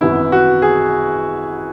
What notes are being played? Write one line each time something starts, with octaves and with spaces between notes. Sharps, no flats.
G#1 F#2 E3 B3 E4
F#4
G#4